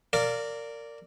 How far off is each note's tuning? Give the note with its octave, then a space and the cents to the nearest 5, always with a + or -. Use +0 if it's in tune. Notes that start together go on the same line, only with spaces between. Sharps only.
A#4 -20 D5 -10 F5 +0